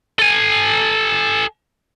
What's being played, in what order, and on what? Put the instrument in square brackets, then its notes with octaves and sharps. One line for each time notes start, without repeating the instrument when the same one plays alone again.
[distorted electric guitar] A4 G#5